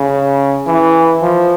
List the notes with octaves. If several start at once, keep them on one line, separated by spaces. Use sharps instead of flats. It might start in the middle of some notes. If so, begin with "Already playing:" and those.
Already playing: C#3
E3
F3